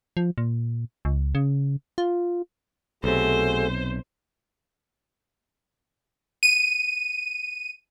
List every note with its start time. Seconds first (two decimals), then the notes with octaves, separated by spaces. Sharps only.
0.17 F3
0.38 A#2
1.05 C#2
1.35 C#3
1.98 F4
3.04 B1 C3 A3 F#4 G#4 A4 C5
6.43 D#7